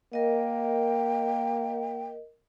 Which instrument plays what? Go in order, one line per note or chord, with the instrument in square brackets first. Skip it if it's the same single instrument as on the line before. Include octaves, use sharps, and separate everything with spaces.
[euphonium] A#3 [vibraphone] A#4 D#5 [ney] G5